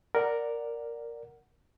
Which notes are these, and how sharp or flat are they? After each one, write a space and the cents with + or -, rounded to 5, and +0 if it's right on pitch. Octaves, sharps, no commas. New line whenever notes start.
A#4 +0 D5 +0 F#5 +0